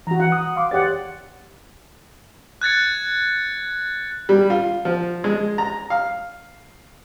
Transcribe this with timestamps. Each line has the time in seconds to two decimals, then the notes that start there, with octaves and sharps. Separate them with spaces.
0.07 E3 F#4 A#5
0.20 F#5
0.32 D#6
0.56 F5 C6 D6
0.71 E2 G4 C#5 D5 F#5 A6
2.61 F#6 G#6 A6 C#7
4.29 G3
4.50 F4
4.85 F3
5.24 G#3
5.58 A#5
5.90 F5